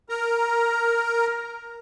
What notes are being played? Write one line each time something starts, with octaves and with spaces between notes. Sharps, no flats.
A#4 A#5